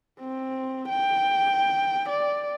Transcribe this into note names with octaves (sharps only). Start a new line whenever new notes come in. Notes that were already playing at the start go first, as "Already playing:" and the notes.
C4
G5
D5